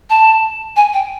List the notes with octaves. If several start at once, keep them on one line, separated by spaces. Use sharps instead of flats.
A5
G#5
G5